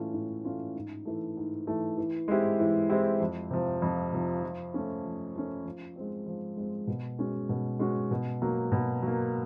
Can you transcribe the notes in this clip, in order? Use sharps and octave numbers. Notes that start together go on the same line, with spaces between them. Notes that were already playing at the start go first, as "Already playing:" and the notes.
Already playing: A2 E3 A3 C#4 F4
A2
E3 A3 C#4 F4
G#2
E3 A3
G#2
E3 A3
E3
G#3 C4 E4 G4
E3
G#3 C4 E4 G4
F2
C3 F3
F2
C3 F3
F3
A3 C#4
F3
A3 C#4
F3
G#3 C4
F3
G#3 C4
B2
G#3 C#4 F#4
B2
G#3 C#4 F#4
B2
F#3 A#3
B2
F#3 A#3